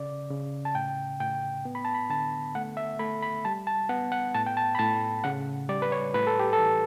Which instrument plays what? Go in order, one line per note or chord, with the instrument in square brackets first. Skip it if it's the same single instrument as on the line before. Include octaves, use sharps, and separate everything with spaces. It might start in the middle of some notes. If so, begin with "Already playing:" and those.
Already playing: [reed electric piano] C#3 D5
C#3
A5
A2 G5
A2 G5
B3
B5
A5
B5
D3 A5
A3 F#5
E5
A3 B5
B5
G3 A5
A5
B3 F#5
F#5
A2 A5
G5
A5
B5
A2 A5
C#3 F#5
G3 D5
B4
C#5
A2 B4
A4
G4
A4
E3